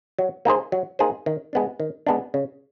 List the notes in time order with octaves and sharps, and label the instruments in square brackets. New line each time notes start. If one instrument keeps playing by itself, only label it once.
[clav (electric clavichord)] F#3
A#3 D#4 G#4 C5
F#3
A#3 D#4 G#4 C5
D#3
G#3 B3 D4
D#3
G#3 B3 D4
C#3